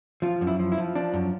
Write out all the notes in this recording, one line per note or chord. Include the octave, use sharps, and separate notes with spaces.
F3 F4
F#2
E4
F3
E4
F3
F3 D4
F#2